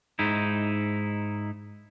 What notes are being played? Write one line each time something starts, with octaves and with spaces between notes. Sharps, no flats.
G#2 D#4 E4